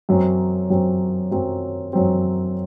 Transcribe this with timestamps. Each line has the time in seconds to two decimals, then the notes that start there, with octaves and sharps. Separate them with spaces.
0.09 F#2 F#3 C4
0.70 F#2 F#3 C4
1.31 F#2 F#3 C4
1.93 F#2 F#3 C4